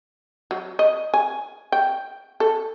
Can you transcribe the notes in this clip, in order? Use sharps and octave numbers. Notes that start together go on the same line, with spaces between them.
F#3
D#5
G#5
G5
A4